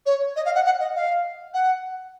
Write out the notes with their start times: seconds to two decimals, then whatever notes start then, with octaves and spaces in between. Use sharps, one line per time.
0.06 C#5
0.36 D#5
0.45 F5
0.55 F#5
0.65 F#5
0.80 D#5
0.95 F5
1.54 F#5